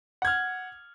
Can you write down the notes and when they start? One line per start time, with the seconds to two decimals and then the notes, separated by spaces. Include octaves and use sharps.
0.22 F#5
0.25 G#6
0.27 F6